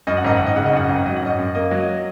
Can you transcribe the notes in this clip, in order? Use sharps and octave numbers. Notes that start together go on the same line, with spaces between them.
F#2 D#5
F#5
G#1 D#5
G#1 F#5
D#5
C#3 F#5
D#5
F#2 F#5
G#1 D#5
F#5
F#3 D#5
F#5
F#2 D#5
F#2
A#3 D#5
F#3
D#5